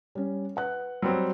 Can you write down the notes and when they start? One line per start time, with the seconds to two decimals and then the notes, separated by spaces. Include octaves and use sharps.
0.15 G3 C#4
0.56 B4 F#5 F#6
1.02 F#3 G3 C4